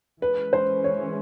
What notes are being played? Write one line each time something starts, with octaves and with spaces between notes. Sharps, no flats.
E3 G#3 C#4 B4
C5
C#5